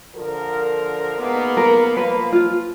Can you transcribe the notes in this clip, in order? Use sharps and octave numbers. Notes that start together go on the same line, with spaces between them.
D3 F3 A#4
G#2 A#3 B3
A#4
F3 A#3 B4
F4